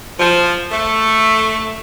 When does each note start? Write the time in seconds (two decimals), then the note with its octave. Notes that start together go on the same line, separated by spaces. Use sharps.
0.19 F3
0.71 A3